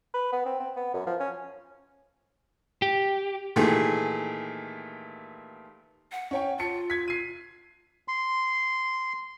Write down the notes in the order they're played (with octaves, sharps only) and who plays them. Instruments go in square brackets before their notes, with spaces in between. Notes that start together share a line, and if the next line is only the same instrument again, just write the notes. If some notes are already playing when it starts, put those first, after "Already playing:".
[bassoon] B4
B3
C4
C4
B3
F#2
F3
C#4
[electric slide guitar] G4
[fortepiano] A#2 D#3 E3 A3 G4 G#4
[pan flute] F#5
[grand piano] C#4 C#5 G5
[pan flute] F4 [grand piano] A5 C#7
[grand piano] G#6 B6
C7 D#7
[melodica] C6